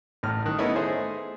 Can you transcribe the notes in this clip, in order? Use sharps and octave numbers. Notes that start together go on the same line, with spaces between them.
A1 A2 F6
D#3 F#6
A3 B3 C#4 D#4 E4
A3 D#4 G#4 C5 E5